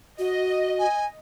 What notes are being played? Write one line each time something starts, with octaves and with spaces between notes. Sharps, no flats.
F#4 D#5
G#5